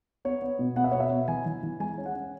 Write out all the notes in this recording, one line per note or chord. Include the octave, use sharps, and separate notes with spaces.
B3 C#5
B3
B2
B3 F#5
E5
C#5
B2
E5
B3
E3 G#5
E3
E3
G#3 G#5
C#4
F#5
C#4